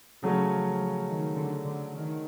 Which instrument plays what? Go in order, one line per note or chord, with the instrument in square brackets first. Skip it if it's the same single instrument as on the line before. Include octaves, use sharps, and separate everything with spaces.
[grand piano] C#3 F#3 A3 C#4 [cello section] E3
[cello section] F3
F3
D#3
D3
D3
D#3